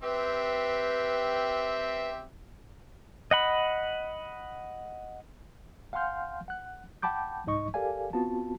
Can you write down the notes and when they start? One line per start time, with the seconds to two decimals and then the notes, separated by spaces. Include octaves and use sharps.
0.03 C4 G4 B4 E5
3.31 D#5 F#5 B5
5.93 F5 F#5 G#5 C6 F6 G6
6.48 F#5 F#6
7.02 F#5 G5 A5 B5 D6 G6
7.46 C2 G#2 D#4 D#5 C#6
7.74 G4 A4 A#4 D5 F5 G#5
8.13 B3 C4 F4 F#4 A5